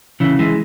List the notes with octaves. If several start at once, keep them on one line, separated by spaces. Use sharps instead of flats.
C#3 E3
E3 G#3